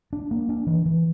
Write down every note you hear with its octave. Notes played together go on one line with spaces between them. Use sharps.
D4
A#3
D4
E3
E3